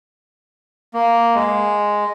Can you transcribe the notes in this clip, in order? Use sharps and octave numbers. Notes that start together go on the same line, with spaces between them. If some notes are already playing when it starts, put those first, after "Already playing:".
A#3
G#3